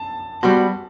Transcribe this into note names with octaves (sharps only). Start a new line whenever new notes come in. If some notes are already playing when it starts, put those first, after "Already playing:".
Already playing: A5
G3 B3 F#4 C5